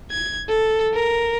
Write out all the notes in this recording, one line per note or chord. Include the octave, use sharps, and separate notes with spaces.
G#6
A4
A#4